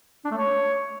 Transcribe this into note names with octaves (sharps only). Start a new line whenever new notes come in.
D4
A3
C#5